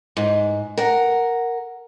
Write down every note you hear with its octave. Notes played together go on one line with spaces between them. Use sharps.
G#2
A#4 F#5